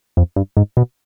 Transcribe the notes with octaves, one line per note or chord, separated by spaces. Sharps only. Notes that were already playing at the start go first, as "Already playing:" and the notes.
F2
G2
G#2
B2